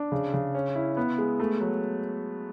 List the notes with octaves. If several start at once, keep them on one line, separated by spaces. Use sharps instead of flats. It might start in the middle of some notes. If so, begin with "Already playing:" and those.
Already playing: D4
C#3
C#3
C#4
E4
B3
G#3
A3
F#3